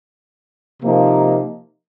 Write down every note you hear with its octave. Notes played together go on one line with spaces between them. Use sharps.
C3 F3 A#3 D#4